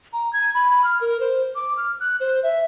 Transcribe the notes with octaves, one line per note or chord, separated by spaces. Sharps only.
A#5
G#6
B5
F6
A#4
C5
D6
F6
F#6
C5
E5